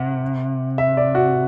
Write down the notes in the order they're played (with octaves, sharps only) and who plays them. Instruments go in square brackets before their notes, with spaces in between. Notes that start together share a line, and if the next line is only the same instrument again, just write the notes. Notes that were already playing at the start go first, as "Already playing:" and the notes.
Already playing: [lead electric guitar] C3 [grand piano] F#5
[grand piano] E5
D5
F#4